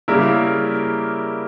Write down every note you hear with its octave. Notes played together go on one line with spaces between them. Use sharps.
C#3 G3 A#3 E4 A#4